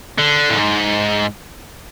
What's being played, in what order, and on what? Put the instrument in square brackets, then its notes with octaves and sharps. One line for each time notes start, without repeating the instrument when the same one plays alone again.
[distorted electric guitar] D3
A2
G#2